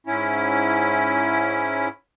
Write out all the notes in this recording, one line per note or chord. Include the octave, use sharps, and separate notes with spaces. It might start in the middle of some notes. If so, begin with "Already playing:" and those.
G#2 C#4 E4